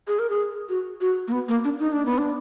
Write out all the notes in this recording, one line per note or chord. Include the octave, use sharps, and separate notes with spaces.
G#4
A#4
G#4
F#4
F#4
A#3
B3
A#3
D4
D#4
D4
B3
D4